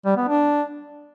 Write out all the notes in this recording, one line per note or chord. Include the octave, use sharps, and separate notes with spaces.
G3
B3
D4